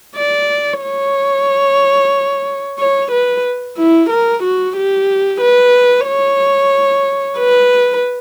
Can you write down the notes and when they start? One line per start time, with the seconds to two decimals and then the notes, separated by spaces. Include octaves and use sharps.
0.16 D5
0.82 C#5
2.79 C#5
3.12 B4
3.77 E4
4.10 A#4
4.43 F#4
4.76 G4
5.41 B4
6.07 C#5
7.38 B4